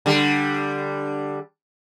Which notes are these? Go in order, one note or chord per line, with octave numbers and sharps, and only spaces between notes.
D3 G3